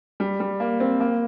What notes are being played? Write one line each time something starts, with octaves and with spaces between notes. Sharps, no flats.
G3
G3
A#3
C4
A#3